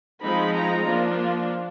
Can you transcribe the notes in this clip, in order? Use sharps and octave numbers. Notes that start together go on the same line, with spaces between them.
F3 G#3 C4 D#4 B5
A#5
F3 A#3 D4 F4